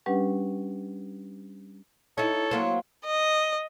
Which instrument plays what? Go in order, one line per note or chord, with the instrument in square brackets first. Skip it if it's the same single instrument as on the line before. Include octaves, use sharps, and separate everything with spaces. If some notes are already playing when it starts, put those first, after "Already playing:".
[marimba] G3 C#4 D4 G4 B4 F#5
[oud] D#4 E4 [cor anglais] A4 [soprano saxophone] C#5
[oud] F#3 A#3 C4
[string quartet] D#5